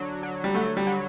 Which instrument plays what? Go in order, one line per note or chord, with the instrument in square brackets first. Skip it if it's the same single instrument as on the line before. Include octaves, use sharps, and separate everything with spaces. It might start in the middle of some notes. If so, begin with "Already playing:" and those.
Already playing: [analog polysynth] D3 F#3
F#3
[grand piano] G3
[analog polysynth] F#3 [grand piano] A3
[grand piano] G3
[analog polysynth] F#3